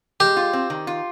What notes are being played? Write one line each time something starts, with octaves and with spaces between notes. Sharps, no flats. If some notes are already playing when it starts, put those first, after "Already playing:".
G#3 G4
F4
C4
D#3
F4